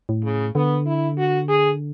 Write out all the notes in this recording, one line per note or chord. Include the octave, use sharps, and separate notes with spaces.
A2
C#3
D3 B3
E4
F#4
G#4